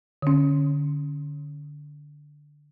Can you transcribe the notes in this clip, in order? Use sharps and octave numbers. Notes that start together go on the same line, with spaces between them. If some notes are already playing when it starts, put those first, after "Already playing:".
D3 C#4